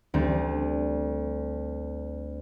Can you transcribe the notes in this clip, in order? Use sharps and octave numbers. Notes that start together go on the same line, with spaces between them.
D2 G3 C4